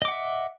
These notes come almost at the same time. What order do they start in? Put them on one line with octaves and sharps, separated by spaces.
D#5 D6 F#5 E5